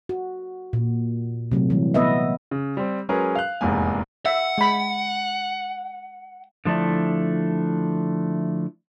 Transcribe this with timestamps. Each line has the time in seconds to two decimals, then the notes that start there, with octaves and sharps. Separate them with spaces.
0.09 F#4
0.73 A#2
1.52 C3 F#3 A3
1.70 E3 G3 A3
1.94 B3 B4 D#5 E5
2.51 C#3
2.77 G3 C4
3.09 F#3 G#3 C#4 G#4 A#4 B4
3.35 F5 F#6
3.61 F1 E2 G#2 A#3 G#5
4.26 E5 F#5
4.58 G#3 B5
6.65 D3 F3 A3 D4 E4